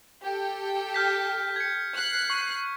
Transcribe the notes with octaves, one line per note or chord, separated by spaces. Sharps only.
G4 A4 G5
F6 G6 B6
G#6 C#7
F#6 C7
C#6